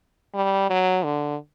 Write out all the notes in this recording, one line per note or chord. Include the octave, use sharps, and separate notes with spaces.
G3
F#3
D3